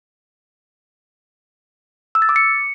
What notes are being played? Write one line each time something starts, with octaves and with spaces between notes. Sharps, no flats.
E6
A6
D6
C#7